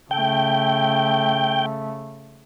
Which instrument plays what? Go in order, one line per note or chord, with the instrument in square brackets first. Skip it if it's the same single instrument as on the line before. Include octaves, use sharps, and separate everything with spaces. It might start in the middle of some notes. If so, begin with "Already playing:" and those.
[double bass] C#3 A3 [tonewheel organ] G5